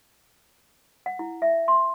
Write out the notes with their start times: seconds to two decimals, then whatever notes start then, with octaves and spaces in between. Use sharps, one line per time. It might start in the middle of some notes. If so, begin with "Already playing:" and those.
1.06 F#5
1.19 E4
1.42 E5
1.68 C6